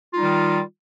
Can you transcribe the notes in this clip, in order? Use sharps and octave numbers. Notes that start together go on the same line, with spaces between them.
D#3 G3 D#4 F4